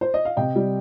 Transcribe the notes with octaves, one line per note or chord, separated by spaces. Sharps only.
C5
D#5
F5
C3 D#5 G5
G3